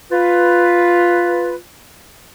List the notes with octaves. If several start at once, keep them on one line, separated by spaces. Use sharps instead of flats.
F4 B4